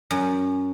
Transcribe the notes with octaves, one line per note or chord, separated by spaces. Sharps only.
F#2